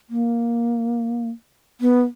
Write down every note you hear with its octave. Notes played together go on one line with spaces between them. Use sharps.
A#3
B3